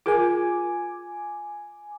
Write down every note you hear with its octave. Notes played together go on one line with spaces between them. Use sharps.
F4 G#4 A#4 G#5 D6